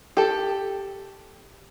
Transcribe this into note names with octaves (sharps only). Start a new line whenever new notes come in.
G4 A4